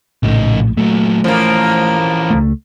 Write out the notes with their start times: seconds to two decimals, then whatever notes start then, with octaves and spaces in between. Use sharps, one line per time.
0.23 A#1 A2 C#3 D#4
0.77 A#2 F#3 A3
1.24 E3 F3 A#3 C#4
2.30 C#2 A3